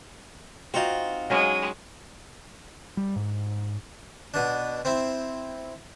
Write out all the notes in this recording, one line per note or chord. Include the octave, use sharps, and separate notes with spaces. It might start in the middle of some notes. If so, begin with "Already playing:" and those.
C4 D#4 F4 F#4
F#3 G#3 C#4
G3
G#2
B2 D4
C4 E4